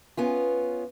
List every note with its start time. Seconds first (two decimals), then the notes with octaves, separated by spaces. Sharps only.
0.17 B3 C#4 F4